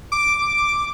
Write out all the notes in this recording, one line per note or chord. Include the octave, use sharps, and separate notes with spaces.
D6